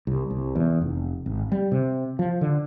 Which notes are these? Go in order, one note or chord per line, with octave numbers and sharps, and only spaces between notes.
C2
C2
E2
F1
G#1
G3
C3
F3
D3